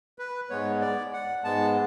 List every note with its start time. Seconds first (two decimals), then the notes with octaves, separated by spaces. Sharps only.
0.19 B4
0.50 G#2 G#3 B3 C#5
0.81 D5
1.13 F#5
1.44 G#2 G#3 B3 A5